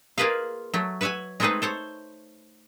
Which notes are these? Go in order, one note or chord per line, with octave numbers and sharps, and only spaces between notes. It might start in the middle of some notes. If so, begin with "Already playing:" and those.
A#3 F4 G#4 B4 D#5 F5
F#3 A3
B4 C#5 E5 F#5 G#5
G#3 A3 C4 D#4 G#4 B4
A4 C5 C#5